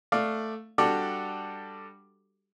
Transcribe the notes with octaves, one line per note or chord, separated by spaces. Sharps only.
A3 D5 F5
G3 D4 F#4 G4 A4 D5